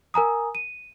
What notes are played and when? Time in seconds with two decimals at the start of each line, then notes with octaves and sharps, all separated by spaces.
0.14 A#4 G#5 A#5 D#6
0.55 D#7